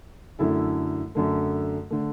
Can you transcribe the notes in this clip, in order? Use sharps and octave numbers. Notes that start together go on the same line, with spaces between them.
F#2 D3 A3 E4 A4
F#2 D3 A3
D3 A3